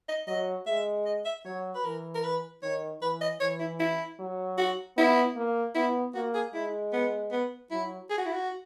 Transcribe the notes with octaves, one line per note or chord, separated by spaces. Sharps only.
D#5
F#3 D#5
G#3 E5
D#5
E5
F#3 C#5
B4
E3 A#4
A#4
B4
D#3 C#5
E3 B4
D#5
E3 C#5
E4
E4
F#3
F#4
B3 E4
A#3
B3 E4
A#3 F#4
G#4
G#3 E4
B3
B3
F#3 E4
G#4
F#4
E4
F#4